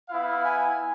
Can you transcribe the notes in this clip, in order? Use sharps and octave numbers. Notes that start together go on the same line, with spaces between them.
B3 E4 F5
G#5